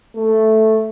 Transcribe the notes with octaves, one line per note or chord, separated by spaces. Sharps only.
A3